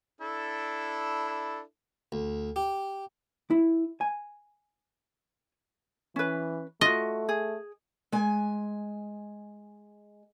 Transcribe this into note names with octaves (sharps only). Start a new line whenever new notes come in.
D4 E4 A4
D2
G4
E4
G#5
E3 C#4 B4
A3 F4 F#4 D#5
G#4
G#3 G#5